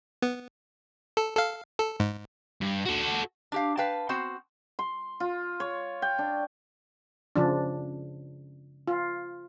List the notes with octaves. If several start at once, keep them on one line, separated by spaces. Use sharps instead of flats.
B3
A4
A4 F5
A4
G#2
G2
F#4 A4
D4 G4 F5
B4 F5 G5 A5
B3 C4 F#4 C5
C6
F4
C#5
G5
D4
C#3 F3 D4
F4